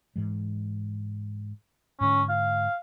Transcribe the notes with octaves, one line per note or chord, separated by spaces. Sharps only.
G#2 E3 G#3
G#2 D3 C#4
F5